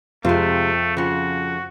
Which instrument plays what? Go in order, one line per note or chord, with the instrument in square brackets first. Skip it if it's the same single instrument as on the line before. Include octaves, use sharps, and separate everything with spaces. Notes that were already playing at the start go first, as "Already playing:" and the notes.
[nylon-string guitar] F2 C4 F4 [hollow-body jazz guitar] C3 G#3 [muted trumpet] A3
[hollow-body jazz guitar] C#3 F3 [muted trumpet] F#4